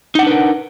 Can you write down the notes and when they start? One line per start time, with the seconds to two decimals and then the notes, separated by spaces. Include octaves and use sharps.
0.15 D#4
0.19 F#5
0.23 D4
0.27 B4
0.30 A#4